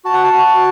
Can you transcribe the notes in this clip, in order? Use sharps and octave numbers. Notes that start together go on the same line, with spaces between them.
F#4 A5
F#5
A5
F#4